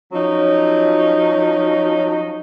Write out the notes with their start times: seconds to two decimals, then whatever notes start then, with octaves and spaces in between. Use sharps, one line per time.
0.12 F3 F#3 C#4 D#4